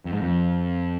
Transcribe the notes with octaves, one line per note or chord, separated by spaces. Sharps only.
F2
G#2
F2